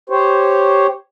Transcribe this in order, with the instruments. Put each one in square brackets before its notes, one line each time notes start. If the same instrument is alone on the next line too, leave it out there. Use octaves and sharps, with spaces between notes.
[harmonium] G4 C5 C#5